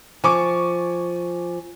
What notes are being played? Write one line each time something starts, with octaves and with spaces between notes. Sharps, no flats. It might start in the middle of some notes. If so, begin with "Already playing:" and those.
F3 G#5 C#6 D6